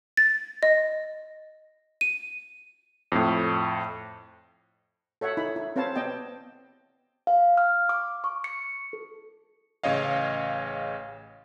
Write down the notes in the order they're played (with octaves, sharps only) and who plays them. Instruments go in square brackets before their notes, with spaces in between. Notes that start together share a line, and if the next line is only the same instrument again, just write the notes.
[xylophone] A6
D#5
D#7
[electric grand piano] F2 A2
[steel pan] A4 C#5 E5 F#5
D#4 E4 B5
E4
C4 B4 C#5 F5 A5
B3 D5 D#5 G5 A5
[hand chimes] F5
F6
D6
C#6
C#7
A4
[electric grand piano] A1 C#3 C#5 D#5 F5